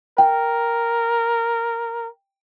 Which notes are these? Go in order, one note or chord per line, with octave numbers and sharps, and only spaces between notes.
A#4 G5